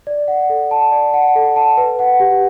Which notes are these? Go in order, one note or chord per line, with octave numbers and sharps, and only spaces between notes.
D5
F#5
A4
A5
D5
F#5
A4
A5
B4
F#5
G4